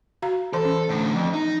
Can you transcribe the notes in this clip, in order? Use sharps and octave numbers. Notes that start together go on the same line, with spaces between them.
F#4 F5 A#5
E3 A4 C5 C6
C#4
A2 D3
F2
D#4